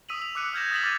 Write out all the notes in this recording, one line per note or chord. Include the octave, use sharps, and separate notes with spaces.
D#6 E6 B6 D#7 F7 F#7
F7
D6 E6 F#6 C#7 D#7
F6 G6 G#6 A#6 E7
D#6 A6 B6 F#7
D6 F6 A6 D#7